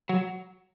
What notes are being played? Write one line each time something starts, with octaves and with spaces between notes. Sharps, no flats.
F#3